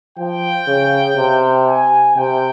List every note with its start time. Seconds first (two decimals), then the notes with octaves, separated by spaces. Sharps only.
0.17 F3 G5
0.67 C#3
1.17 C3
1.66 G#5
2.16 C3 G5